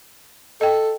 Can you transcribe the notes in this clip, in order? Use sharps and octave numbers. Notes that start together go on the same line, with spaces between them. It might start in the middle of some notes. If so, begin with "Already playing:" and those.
A4 D#5 G5